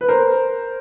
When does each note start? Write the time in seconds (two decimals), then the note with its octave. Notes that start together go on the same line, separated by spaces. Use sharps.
0.01 B4
0.08 A#4 C5